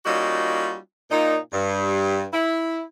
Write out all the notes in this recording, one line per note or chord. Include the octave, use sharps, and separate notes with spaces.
G3 A#3 C#4 D#4 F4 F#4
A#2 D#4
G2
E4